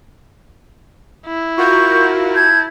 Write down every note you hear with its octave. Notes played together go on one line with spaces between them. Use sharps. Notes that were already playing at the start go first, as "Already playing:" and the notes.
E4
F4 F#4 A#4 C#6 G6
A5 G6 G#6